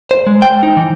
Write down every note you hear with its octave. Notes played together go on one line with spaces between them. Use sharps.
C5
G#3
G5
D#4
E3